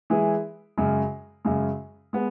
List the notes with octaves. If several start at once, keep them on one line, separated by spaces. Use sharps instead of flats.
E3 G#3 E4 G#4
F#2 C#3 G#3
F#2 C#3 G#3
G#3 B3